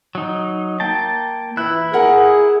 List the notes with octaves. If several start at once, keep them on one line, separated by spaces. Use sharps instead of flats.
F#3 D#4
A#3 G5 A5
E3 E4 F#6
G#4 A#4 F#5